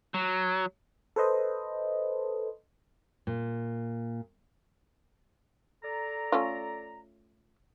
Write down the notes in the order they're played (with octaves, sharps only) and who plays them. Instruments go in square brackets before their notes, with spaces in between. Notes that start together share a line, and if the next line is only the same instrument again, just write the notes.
[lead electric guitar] F#3
[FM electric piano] A4 B4 C5 D#5
[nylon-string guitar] A#2
[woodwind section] A4 D5 A#5
[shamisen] A3 C#4 F4